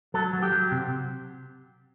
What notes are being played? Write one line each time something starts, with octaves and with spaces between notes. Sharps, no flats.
F#3 A4
F#3
G4
F#3
C3